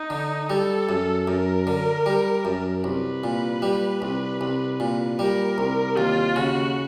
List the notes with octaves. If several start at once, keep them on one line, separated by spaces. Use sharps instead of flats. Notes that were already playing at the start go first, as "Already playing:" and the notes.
Already playing: D#4
D3
G3 A4
F#2
F#2 A#4
D3
G3
F#2
C2 B4
A#2
G3
C2
C2
A#2
G3 A#4
C2
D#2 F4
C#3 F#4